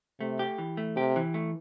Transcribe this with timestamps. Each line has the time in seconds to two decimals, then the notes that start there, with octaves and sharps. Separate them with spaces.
0.20 C3 A3
0.39 G4
0.58 E3
0.77 A3
0.96 C3 G4
1.16 E3
1.34 A3